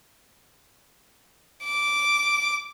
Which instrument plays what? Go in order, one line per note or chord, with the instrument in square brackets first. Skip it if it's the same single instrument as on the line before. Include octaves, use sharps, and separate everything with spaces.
[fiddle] D6